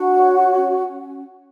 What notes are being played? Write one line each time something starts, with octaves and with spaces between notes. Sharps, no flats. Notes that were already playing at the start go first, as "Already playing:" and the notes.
Already playing: D4 F#4 F#5
C#5
C#4